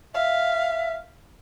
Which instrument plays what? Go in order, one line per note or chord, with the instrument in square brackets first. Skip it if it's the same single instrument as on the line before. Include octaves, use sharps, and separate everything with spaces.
[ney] E5 [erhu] F5